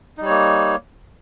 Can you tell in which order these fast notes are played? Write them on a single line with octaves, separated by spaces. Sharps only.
D#4 G3 C#5 A#3